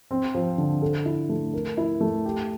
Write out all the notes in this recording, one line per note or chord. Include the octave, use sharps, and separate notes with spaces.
C4
F3
D3
A4
E4
A3
A#4
E4
A3
G4